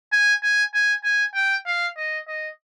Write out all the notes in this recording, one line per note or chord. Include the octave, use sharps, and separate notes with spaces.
G#5
G#5
G#5
G#5
G5
F5
D#5
D#5